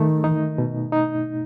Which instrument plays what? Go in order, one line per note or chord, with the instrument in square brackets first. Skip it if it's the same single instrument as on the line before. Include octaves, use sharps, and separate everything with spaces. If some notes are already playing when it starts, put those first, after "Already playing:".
Already playing: [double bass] D#3 [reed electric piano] A3
[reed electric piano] D#4
B2
D#4